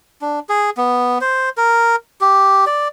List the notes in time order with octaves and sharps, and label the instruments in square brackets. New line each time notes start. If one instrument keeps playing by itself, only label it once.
[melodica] D4
G#4
B3
C5
A#4
G4
D5